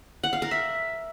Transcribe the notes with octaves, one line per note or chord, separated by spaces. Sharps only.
F#5
F5
A#4
E5